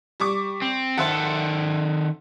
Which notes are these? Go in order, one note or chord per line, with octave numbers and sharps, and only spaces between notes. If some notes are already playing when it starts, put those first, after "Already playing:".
G3 C#6 D6
C4
D#3 A4 C5 E5 F#5